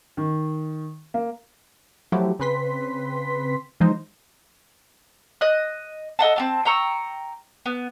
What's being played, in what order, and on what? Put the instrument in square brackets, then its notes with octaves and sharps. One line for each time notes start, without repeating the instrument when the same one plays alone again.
[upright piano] D#3
A#3
[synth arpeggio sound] F3 F#3 A3 E4 F#4 G4
C#3 C4 B4 C6 B6
E3 F3 G#3 D#4 C5
[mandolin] D#5 F#6
A4 D#5 F#5 A5
C4 G4 A5
G5 A#5 C#6 E6
B3